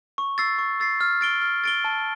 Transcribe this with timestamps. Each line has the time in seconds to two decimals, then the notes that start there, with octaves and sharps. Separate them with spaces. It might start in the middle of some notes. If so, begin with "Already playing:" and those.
0.18 C#6
0.38 E6 A6 C7
0.58 C#6
0.80 E6 A6 C7
1.01 F6
1.21 A6 D7 G7
1.42 F6
1.64 A6 D7 G7
1.84 A5